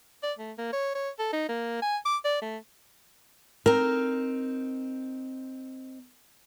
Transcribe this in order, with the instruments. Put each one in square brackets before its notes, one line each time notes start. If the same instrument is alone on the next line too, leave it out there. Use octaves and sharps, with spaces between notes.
[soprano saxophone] D5
A3
A#3
C#5
C#5
A4
D#4
A#3
G#5
D6
D5
A3
[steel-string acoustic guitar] C4 D#4 [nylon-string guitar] A#4